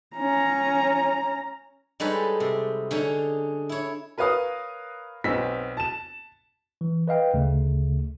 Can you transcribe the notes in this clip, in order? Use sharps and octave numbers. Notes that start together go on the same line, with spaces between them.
C#4 A#5
G3 G#3 D#4 A4 B4 C#5
C3
D3 C#4 D#4 G#4 C#5
E4 C#5
A#4 B4 C#5 F5 D#6
B1 B3 C4 E6 B6
A5 E7
E3
B4 D#5 F5 G5
D2 C#3 A3